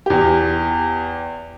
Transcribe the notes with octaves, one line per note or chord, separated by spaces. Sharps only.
E2 G4